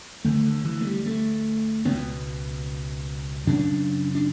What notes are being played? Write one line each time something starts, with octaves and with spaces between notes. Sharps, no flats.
D2 D3 A3
D3
E3
A3
G3
A3
C#2 B3
B2
F#2 C#3 D4
D4